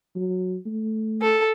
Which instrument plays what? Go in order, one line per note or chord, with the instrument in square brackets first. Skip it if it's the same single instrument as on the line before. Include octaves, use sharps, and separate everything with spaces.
[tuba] F#3
A3
[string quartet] A4